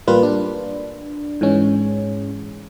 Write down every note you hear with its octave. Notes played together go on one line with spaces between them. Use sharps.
A1 G3 A#3 F4 B4
D4
G#2 E3 G#3 C#4